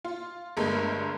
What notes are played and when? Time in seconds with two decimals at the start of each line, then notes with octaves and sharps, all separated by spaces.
0.04 F4
0.57 G1 G2 G#3 A3 A#4